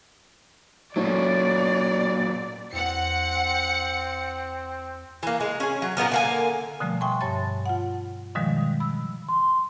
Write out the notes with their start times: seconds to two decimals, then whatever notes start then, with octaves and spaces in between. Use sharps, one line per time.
0.96 A#2 F#3 A3 C#4 D5
2.73 E2 C4 F#5 C#7
5.23 E3 A#3
5.40 G#3
5.60 C#4 G#4
5.82 F#3
5.97 A#2 F#3 B3 A#4
6.12 D3 A#3 G#5
6.80 B2 D3 F3 G3 A3
7.00 E5 G5 G#5 C6 C#6
7.21 G2 C#5 A5 A6
7.66 F4 F#5
8.35 B2 D3 D#3 F3 G3 G#3
8.80 B5 E6
9.29 C6